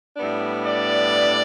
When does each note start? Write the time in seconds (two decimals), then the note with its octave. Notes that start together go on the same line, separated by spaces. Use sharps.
0.17 A2 G3 B3 D4
0.65 D5